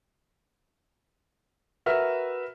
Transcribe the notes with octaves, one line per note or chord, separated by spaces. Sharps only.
F#4 A#4 B4 E5 F6